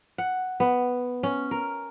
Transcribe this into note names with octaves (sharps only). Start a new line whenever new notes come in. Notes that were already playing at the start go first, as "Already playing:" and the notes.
F#5
B3
C#4
A#4